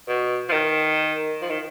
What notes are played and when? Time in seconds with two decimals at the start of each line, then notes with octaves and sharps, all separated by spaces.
0.08 B2
0.49 F3
0.53 D#3
1.42 F3
1.50 D#3